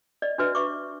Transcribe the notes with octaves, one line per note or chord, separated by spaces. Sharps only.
D5 D#5
D4 F#4 B4 E5
E5 C#6 D6